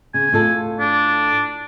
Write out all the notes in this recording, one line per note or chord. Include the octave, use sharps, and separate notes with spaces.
C#3 G#5
A2 F4 A4
D4